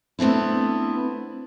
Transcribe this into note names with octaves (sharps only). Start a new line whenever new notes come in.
A3 B3 C4 D4 E4